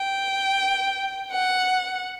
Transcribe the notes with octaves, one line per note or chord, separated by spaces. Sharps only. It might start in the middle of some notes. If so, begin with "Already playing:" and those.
Already playing: G5
F#5